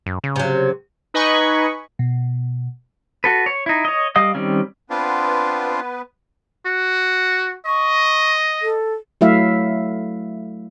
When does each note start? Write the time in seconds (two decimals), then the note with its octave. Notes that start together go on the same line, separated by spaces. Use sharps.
0.06 F#2
0.24 C#3
0.36 C3 F#3
1.14 D#4 B4 D#5 G#5 B5 C#6
1.99 B2
3.24 F#4 A4 B4
3.46 C#5
3.66 D#4 E4
3.85 C#5 D#5
4.16 G3 D#5 F5 D#6
4.35 D#3 G3 C4 C#4
4.90 B3 C4 D4 F4 B4
6.66 F#4
7.66 D#5 C#6
8.62 A4
9.21 F#3 A3 E4 E5 F5